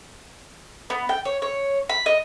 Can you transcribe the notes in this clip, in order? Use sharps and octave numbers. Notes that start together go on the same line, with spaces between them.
B3
G5
C#5
C#5
B5
D#5